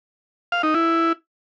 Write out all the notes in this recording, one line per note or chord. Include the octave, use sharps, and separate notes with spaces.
F5
D#4
E4